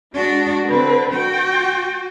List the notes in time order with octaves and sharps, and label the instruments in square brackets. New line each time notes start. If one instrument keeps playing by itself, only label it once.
[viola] G#3 [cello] D4 F#4
[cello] D3 C4 [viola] B4
[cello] F#4 [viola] G5